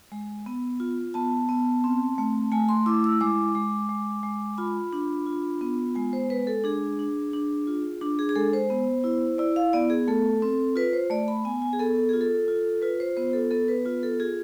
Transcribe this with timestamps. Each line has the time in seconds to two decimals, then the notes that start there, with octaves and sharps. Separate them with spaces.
0.12 G#3
0.46 B3
0.80 F4
1.14 B3 A5
1.49 B3
1.84 C4
2.18 A3
2.52 A3 G#5
2.69 C6
2.86 E4 D6
3.04 E6
3.21 G#3 D6
3.55 G#3
3.89 G#3
4.23 G#3
4.58 F4 B5
4.93 D4
5.27 F4
5.61 B3
5.95 G#3 G#5
6.13 C5
6.30 G#3 B4
6.47 A4
6.64 D4 G#4
6.99 D4
7.33 D4
7.67 F4
8.01 D4
8.19 G#4
8.29 G#4
8.35 G#3 A4
8.53 C5
8.70 B3
9.04 E4
9.38 E4 D5
9.56 F5
9.73 B3 D5
9.90 G#4
10.08 A3 A4
10.42 C4
10.76 F4 B4
10.93 C5
11.10 A3 D5
11.28 B5
11.45 B3 G#5
11.62 G#5
11.73 G#4
11.79 B3 A4
11.97 A4
12.09 F4 G#4
12.21 A4
12.48 F4
12.82 F4 B4
13.00 C5
13.17 B3 C5
13.33 A4
13.51 B3 A4
13.68 B4
13.85 F4 B4
14.03 A4
14.20 F4 G#4